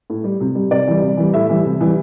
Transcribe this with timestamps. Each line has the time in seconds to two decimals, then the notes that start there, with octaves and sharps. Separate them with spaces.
0.10 A2
0.24 G3
0.40 C3
0.55 G3
0.71 C3 D5
0.87 E3 G3
1.02 C3
1.17 E3 G3
1.34 A2 E5
1.50 E3 G3
1.65 C3
1.81 E3 G3